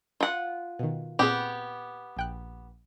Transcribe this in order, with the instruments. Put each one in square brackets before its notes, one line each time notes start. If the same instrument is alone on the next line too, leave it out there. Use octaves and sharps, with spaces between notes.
[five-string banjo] F4 F#5
[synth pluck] B2 D#3
[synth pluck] A#2 C4 G#4 [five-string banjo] B3 G4
[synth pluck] A#1 G5 F#6